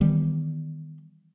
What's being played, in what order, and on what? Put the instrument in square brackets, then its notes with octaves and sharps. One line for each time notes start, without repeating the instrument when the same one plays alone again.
[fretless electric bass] D#3 E3 G3 B3